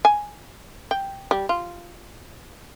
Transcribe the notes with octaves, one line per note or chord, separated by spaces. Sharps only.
G#5
G5
G3
F4